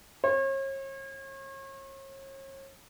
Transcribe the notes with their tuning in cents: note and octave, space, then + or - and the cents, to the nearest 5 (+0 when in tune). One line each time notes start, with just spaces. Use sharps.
C#5 -40